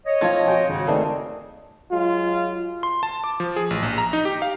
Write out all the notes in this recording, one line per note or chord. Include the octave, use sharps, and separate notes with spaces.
C#5 D#5
F3 C4 F4 A5 G#6
F#4 G5 G#5
G#1 C#3
A3 C4 D4 D#4 G#4 A#4
F#3 G#3 F4
C6
A5
D6
F3
G#4
A1
A#1
A#5
D#4
G4
F5